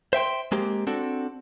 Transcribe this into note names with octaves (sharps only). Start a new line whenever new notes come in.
C5 E5 G5 C6
G#3 A#3 C4 G4
C4 D4 F#4 A4